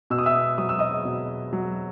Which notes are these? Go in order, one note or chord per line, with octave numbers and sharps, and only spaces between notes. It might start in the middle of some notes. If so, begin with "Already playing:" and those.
B2 E6
D#6
E5 E6
F#3 D#6
E6
D#5 D#6
B2
F#3